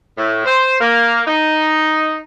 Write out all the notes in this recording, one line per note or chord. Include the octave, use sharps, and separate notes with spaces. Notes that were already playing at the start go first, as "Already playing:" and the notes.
A2
C5
A#3
D#4